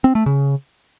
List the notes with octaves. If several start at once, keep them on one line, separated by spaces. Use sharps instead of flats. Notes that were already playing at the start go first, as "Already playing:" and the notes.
C4
A3
C#3